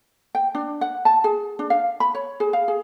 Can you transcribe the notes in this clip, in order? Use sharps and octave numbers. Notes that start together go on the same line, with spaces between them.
G5
D4
F#5
A5
G#4
D4
F5
B5
C#5
G#4
F5
G#4